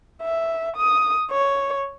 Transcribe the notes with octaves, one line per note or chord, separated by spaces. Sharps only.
E5
D#6
C#5